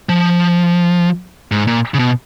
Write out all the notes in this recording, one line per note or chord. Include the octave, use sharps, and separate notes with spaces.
F3
G#2
A#2
C#3
B2